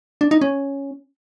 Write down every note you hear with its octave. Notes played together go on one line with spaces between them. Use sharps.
D4
D#4
C#4